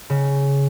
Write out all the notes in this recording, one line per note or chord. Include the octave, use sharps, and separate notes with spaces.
C#3